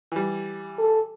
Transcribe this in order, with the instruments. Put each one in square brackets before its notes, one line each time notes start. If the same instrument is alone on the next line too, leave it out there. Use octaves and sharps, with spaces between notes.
[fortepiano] E3 G3
[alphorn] A4